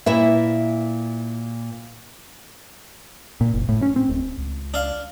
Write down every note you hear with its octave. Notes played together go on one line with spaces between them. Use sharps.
A#2 E4 B4 E5
A#2
F#1
A2
C#4
C4
D1
C#2
D4 F5